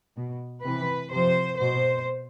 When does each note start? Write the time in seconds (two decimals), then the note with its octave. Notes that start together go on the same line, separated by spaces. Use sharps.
0.16 B2
0.64 C3 E3 B4
1.12 C3 F3 C5
1.59 B2 C5